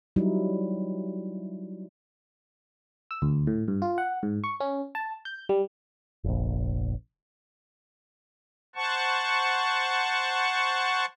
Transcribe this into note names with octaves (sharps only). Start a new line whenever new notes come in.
F#3 G3 D#4 E4
E6
D2
A2
G2
F4
F#5
G#2
C#6
C#4
A5
G6
G3
F1 A#1
C5 F#5 A5 C#6